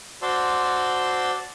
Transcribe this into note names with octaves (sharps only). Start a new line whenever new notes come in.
F#4 C5 D5 A5 C6 E6